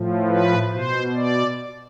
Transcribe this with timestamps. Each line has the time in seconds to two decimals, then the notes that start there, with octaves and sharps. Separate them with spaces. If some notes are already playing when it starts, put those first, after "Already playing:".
Already playing: A2 F3
0.28 B4
0.72 B2 C5
1.16 D5